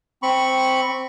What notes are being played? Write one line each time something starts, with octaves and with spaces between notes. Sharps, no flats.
C4 B5 C#6